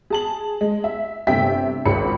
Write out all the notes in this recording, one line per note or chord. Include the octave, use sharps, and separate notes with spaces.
G#4 A5 F#7
G#3
E5
G1 C3 A3 E5 G5 B6
G#1 C#2 B5 C#7